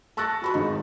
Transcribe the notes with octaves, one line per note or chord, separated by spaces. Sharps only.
A5 C#6 E6 F#6 A6 A#6
F#4 B5 C#6
G#1 G#2 D#4